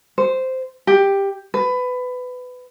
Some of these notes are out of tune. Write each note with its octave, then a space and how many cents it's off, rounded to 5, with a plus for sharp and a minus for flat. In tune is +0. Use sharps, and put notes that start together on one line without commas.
C5 -10
G4 +10
B4 +20